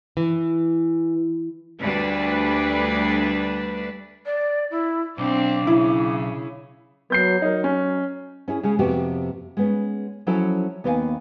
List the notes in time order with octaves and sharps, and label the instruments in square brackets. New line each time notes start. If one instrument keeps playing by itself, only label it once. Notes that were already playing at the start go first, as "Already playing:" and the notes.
[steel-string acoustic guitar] E3
[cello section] D2 G3 D4 B4
[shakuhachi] D5
E4
[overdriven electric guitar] B1 [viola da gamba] C4 D4 [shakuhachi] D6
[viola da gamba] C#3 [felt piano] E4
[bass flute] F#3 [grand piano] B3 G6 C7
[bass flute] F#3 [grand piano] D#4 A#4
[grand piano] C#4
[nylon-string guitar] C#4 E4 G#4
C#3 G#3 C#4 G#4
F2 C3 B3 F#4 G4
G#3 B3 C#4
F3 F#3 C#4 E4 A4 C#5
D#2 B3 C#5 D5 F5 G#5